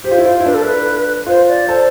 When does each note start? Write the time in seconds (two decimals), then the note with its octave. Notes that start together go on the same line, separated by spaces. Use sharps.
0.04 G4 C5
0.11 F4
0.18 E4
0.24 F4 C5
0.40 E4
0.45 D4 B4
0.54 A4
0.62 B4
1.26 F4 C5
1.48 D5
1.68 A4 C5